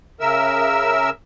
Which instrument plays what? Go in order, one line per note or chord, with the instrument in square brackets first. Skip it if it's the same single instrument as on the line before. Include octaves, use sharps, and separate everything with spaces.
[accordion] C#3 A#4 E5 E6